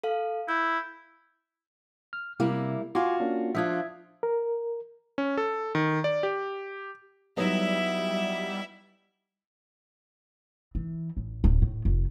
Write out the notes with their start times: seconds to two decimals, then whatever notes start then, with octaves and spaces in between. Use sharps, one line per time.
0.04 A4 F5
0.49 E4 G6
2.13 F6
2.40 C3 G3 A#3 E4
2.95 F4 F#4 G#5 C6 D6
3.20 A#3 C#4 D4
3.55 F3 D4 F4 E5 D#6 G#6
4.23 A#4
5.18 C#4
5.37 A4
5.75 D#3
6.04 D5
6.23 G4
7.37 F#3 G3 B3 D#4 E4 C#5 D#5 E5
10.75 E3
11.17 A1
11.44 D1
11.62 A2
11.85 F1